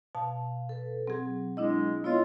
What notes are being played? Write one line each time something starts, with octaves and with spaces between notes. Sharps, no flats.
B2 F5 A5
A4 B4
F#3 C4 G#4
G#3 D4 E4 D#5
B3 E4 F4 C#5 D#5